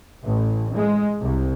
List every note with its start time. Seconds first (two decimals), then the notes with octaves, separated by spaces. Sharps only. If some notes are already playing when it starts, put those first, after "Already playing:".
0.24 A1
0.74 G#3
1.21 C2